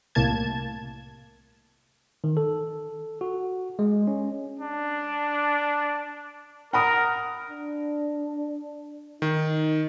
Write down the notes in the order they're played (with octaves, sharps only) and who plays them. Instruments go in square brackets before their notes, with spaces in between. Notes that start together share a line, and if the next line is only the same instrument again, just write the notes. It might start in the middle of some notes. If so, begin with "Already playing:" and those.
[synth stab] C2 A2 C3 A#3 A5 G#6
[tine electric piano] D#3
A4
F#4
G#3
C#4
[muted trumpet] D4
[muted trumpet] A#4 [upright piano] F#5 B5 D#6
[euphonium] D4
[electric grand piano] D#3 [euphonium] D#4